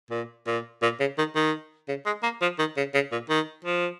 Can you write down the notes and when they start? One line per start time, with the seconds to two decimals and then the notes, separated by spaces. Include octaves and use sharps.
0.11 A#2
0.47 A#2
0.82 A#2
1.00 C#3
1.18 D#3
1.36 D#3
1.88 C#3
2.06 G#3
2.23 A#3
2.42 F3
2.59 D#3
2.77 C#3
2.94 C#3
3.12 A#2
3.29 D#3
3.65 F3